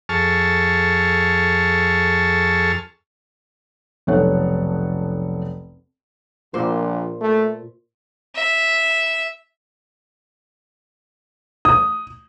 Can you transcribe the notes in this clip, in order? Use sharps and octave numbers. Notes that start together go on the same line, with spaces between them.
F2 G#4 A4 A5 C#6 F6
F1 B1 A4 C#5 F#5
A#1 A#2 C5
A3
E5
D#6